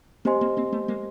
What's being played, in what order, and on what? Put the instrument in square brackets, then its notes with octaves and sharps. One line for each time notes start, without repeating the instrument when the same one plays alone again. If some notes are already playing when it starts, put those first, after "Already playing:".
[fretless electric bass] A#3 C4 [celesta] G4 C5 D#5 G#5 C6
[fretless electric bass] A#3 C4
A#3 C4
A3 B3
G#3 A#3